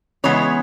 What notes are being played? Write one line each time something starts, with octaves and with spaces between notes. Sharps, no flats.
C#3 E3 G#3 B3 C#5